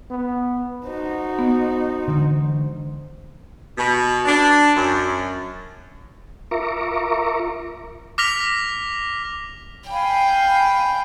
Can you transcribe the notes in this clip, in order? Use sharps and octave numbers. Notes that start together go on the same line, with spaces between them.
B3
D#4 F#4 C5
B3
D3 E3 G#3
B2
D4
F#2
F4 A#4 E5 A#5 C#6 D6
D6 F6 A#6 B6 F7
F5 G5 G#5 B5